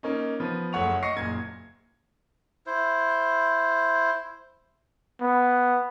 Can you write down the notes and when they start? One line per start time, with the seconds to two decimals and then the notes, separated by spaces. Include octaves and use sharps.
0.03 A#3 C#4 D#4
0.40 F3 B3
0.73 F#1 A3 C#5 F#5 C#6 F7
1.03 D#5 C#6 A#6 C7 C#7
1.17 F#1 A#2 G#6
2.67 E4 C5
5.21 B3